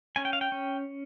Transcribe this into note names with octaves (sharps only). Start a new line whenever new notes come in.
C#4 G#5
G5
F5
G5
C#4